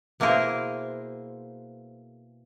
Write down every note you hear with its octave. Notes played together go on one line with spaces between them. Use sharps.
B2 A#3 E4 G#4 A#4 C5